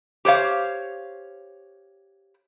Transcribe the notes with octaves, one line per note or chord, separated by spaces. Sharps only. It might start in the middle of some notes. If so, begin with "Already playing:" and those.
G4 C5 C#5 F5